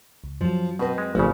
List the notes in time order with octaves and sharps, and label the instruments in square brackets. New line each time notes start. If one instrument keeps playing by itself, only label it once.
[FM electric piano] C#2
[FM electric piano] F#2 F#3 [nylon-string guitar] F3
[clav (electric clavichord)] B2 [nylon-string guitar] C4 B4 D#5
[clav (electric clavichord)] G#3
[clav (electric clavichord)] G#1 C#3 [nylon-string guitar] F3 [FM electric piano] A3 A#3 D5